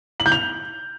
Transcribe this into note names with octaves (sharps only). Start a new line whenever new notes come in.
F#7
G6
F7